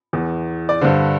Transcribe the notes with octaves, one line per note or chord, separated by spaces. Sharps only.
E2 E3
D5
G2 D3 C5